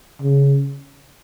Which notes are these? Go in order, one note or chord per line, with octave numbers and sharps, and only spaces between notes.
C#3